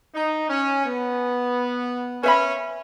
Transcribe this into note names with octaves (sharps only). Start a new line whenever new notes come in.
D#4
C#4
B3
C#4 B4 E5 B5